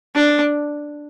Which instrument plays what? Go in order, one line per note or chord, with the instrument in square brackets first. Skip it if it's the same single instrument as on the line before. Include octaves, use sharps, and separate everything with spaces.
[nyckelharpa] D4